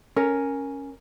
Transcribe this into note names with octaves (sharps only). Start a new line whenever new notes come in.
C#4 A#4